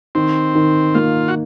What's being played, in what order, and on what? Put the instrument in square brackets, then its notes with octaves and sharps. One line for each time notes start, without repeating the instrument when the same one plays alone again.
[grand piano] D#3 [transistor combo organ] C4
[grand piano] D#3
[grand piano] A#3 [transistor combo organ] F4
[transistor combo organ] F#4